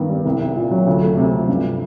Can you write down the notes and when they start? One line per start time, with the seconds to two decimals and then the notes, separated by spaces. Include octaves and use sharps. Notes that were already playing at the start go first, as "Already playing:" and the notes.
Already playing: G2 D#3 B3
0.09 G3
0.25 C2
0.41 C2
0.56 A#2
0.71 F#3
0.87 D2
1.03 A3
1.17 C3
1.33 F3
1.48 G2